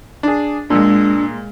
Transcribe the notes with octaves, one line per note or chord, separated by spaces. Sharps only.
D4 G#4
A#2 G#3 D4 E6